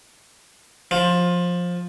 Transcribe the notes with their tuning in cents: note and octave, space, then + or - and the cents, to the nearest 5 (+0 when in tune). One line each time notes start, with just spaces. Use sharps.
F3 +15